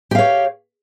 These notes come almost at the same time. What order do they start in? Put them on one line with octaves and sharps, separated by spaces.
G4 F5 C#5